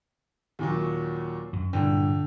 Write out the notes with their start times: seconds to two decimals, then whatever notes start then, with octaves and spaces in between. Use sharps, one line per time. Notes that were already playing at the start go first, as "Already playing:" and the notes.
0.59 D#2 A#2 F#3
1.53 F#2
1.73 G2 A#2 D3 E3 G5